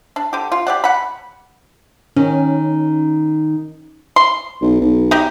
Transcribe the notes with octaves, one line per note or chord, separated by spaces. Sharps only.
D4
D3 G4
F4
G4 D5 F#5
F#5 B5
D#3 C#4
C6
B1
B1
D#4 G4